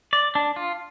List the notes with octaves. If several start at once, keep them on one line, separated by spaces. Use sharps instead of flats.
D5
D4
F4